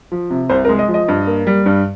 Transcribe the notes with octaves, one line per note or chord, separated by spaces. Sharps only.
F3
C3
C2 C5
A#4
G#3
D#5
F3
D#5
G2
A#3
G3
G2